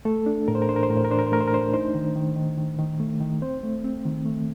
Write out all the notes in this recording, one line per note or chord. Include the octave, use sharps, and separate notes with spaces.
A3 A4
D4
A2 A#4
C5
A#4
D4 C5
A#4
C5
A2 A#4
C5
A#4
D4 C5
A#4
C5
A3 A#4
C5
A#4
D4 C5
A#4
D#4 C5
D#3
D#3
D#3
D#3
D#3
A3
D#3
C4 C5
A3
C4
D#3
A3